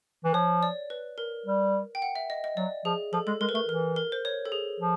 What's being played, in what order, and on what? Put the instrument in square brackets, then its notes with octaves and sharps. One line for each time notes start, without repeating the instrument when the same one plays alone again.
[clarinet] E3
[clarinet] F3 [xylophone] C#5
[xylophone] D5
B4
A#4
[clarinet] G3
[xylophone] G5
F#5
E5
D#5
D#5
[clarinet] F#3 [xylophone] D5
[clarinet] F3 [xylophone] G#4
[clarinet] F3 [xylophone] A4
[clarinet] G#3 [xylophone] A4
[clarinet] G#3 [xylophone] A#4
[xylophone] B4
[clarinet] A3 [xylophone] A#4
[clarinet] E3 [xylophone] A#4
[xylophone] A#4
C5
C#5
A4
G#4
[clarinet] F3